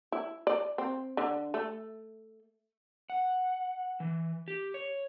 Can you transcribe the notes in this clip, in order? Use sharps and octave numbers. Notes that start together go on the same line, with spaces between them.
E4
D5
C4
D3
A3
F#5
E3
G4
C#5